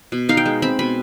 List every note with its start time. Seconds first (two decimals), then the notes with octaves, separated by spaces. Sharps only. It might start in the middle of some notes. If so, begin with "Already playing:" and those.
0.12 B2
0.29 D#4 F5
0.37 G5
0.46 G#3
0.62 C4 B5
0.79 B2 B5